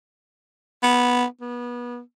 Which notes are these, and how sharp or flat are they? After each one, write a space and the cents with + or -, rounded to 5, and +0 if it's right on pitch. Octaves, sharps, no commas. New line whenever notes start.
B3 -10
B3 -30